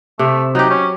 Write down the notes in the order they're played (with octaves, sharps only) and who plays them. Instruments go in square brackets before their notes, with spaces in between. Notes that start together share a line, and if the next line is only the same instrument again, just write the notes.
[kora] C3 [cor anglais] A3
[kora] F#3 G4 [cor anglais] D#4
[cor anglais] C#4